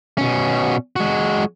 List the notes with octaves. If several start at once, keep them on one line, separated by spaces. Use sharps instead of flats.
B2 C#4
G#3 F#4